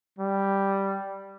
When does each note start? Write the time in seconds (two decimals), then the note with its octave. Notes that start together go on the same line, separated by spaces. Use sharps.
0.18 G3